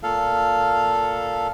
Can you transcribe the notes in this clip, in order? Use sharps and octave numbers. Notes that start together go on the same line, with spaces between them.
A#2 A4 F5